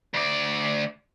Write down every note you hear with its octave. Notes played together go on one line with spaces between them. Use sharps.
D2 D5